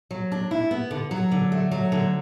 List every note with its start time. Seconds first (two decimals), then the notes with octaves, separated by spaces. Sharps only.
0.11 F#3
0.32 D4
0.51 E4
0.71 B3
0.91 D3
1.11 F#3
1.31 D3
1.52 A3
1.71 F#3
1.92 D3